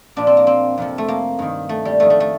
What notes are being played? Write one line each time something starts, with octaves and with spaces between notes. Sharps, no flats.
A#2 F3 D4
C4
A#3
C4
F2 C3 F3
A3
A#3
G2 D#3
A3
G3
F2 D#3 A3
A3
A3